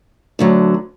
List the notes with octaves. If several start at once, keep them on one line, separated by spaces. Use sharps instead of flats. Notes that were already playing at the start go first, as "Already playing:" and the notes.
D2 D3 F#3